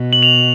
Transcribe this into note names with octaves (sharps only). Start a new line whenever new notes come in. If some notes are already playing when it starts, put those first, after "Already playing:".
Already playing: B2
F#7
F7